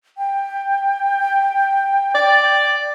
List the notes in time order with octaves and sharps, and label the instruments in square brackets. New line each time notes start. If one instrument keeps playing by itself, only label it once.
[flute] G5
[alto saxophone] D5